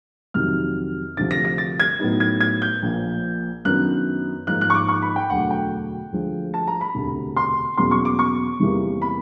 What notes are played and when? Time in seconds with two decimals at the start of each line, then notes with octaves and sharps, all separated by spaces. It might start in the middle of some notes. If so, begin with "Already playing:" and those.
0.34 F2 C3 D#3 F#3 F6
1.17 D2 C3 F3 A6
1.31 A#6
1.45 A#6
1.58 A6
1.80 G#6
1.99 A2 F#3 B3 D#4
2.20 G#6
2.41 G#6
2.62 G6
2.82 A#1 A#2 F3
3.65 F#2 D#3 F#3 B3 D4 F#6
4.47 G#2 F3 A#3 D#4 F#6
4.61 F#6
4.70 C#6
4.75 D6
4.89 C#6
5.02 B5
5.16 G5
5.30 E1 D2 D3 F#3 A3 F#5
5.51 G5
6.12 D2 D3 F3 G#3
6.54 A5
6.67 A#5
6.81 B5
6.95 E1 D2 C3
7.37 C6
7.78 E2 B2 F#3 A#3 C#4 C6
7.91 C#6
8.05 D6
8.19 C#6
8.60 E2 C3 E3 G3 A#3
9.02 B5